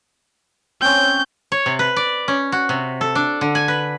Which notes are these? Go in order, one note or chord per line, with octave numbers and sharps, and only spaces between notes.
C4 C#4 G6
C#5
C3
B4
D5
C#4
F#4
C3
A4
D4
D3
G#5
B4